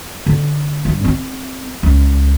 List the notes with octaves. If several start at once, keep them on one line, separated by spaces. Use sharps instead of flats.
D3
G2
C4
C#2